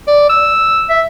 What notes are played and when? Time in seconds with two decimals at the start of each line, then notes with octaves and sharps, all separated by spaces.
0.08 D5
0.30 E6
0.89 E5